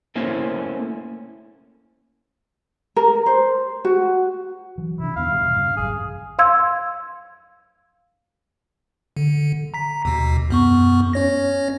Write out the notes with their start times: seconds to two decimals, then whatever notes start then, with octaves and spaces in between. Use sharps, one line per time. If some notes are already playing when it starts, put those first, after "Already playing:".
0.16 A3 A#3 C#4 E4 C5
2.96 A#4
3.26 C5
3.85 F#4
4.78 E3 F#3
4.99 C3 D4 E4
5.16 E2 D#3 B3 F5
5.30 B2 G3
5.55 G2 C#3
5.77 G#1 F#2 G#4
6.39 F5 C6 E6 G#6
9.17 D3
9.74 A#5 B6
10.05 D#2 B2
10.50 F#2 B3 C#6
11.13 C#4 C#5 A#6